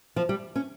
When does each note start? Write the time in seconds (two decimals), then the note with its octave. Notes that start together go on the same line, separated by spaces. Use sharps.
0.16 F3
0.29 G3
0.56 C#4